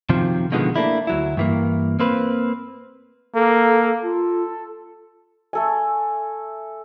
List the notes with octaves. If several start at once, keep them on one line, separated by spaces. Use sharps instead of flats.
F#2 C3 D#3 F3
B2 D3 D#3 F3 G#3 B3
A3 A#3 D4 E4
D2 F#3 E4
G2 E3 A#3
A#3 C4 B4
A#3 A4
F4 A4
A3 A4 G#5